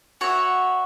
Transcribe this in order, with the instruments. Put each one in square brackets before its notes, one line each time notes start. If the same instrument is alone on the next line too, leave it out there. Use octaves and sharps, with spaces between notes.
[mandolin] F#4 C#5 E5